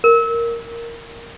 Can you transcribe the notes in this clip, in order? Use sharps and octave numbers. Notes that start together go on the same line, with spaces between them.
A#4